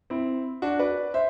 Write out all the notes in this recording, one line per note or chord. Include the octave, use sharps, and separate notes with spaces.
C4 E4
D4 F#4
B4 D5
C5 E5